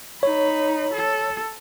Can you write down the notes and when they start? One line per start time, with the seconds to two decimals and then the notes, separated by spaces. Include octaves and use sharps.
0.23 D#4 C#5 B5
0.94 A4